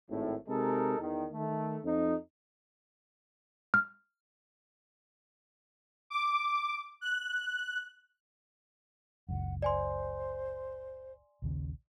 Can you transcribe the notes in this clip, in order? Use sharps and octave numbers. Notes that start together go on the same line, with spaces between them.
G#1 A2
C3 G#3 D#4 A4 A#4
E2 D#3
D#3 A3
F2 D#4
F6
D6
F#6
F#1 C#2 F#2 F#5
C5 D5 G#5 C6
A#1 D#2 C#3